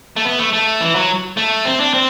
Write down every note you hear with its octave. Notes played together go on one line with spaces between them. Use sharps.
A3
B3
A3
A3
E3
F#3
A3
C4
D4
C4